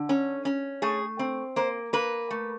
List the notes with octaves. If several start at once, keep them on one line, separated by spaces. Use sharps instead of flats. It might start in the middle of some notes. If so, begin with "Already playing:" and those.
Already playing: D3
C#4
C#4
A3 G#4
C4
A#3 C5
A#3 B4
A3